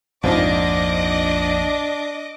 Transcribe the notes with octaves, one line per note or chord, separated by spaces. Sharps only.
A#1 F2 G#2 C4 D4 F4 D#5 D6